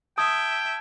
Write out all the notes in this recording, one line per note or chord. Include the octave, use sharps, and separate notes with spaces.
E5 G5 A5 D#6 G#6